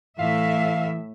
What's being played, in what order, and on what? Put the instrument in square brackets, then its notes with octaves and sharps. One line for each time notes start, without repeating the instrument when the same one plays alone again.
[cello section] A2 E5 [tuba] E3 [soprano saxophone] F5